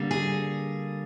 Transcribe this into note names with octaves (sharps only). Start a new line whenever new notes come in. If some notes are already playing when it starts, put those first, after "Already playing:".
Already playing: D3 G3 A#3
G#4